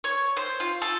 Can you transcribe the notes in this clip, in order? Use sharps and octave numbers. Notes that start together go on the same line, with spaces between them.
C#5
C5
F4
A4